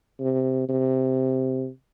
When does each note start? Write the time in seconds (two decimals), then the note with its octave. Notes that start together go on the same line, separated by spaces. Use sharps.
0.20 C3
0.69 C3